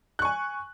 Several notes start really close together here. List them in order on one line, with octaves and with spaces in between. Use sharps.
F#6 C#6 G#5